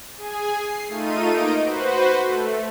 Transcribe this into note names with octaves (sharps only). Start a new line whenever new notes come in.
G#4 G#5
C7
A3 D#4 F4 D#7
A#3 D#4 D#5 D7
F#4 B4 C5
A3